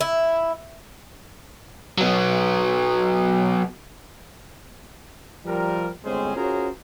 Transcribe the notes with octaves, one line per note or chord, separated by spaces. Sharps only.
E4
F#3 B3
F3 G3 A#4
G1 G#3 C4 C#4 G#4 C5
C#4 F4 F#4 G#4 A#4 C5